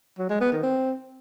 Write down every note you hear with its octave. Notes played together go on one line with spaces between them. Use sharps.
F#3
G#3
B3
D#3
C4